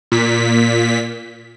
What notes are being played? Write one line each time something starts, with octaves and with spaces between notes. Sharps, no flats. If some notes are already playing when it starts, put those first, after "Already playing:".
A#2 B6